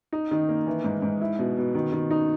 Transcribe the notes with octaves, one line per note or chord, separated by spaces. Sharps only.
D#4
D#3
A#3
E3
G#2
G#2
E4
B2
B2
D#3
D#3
D#4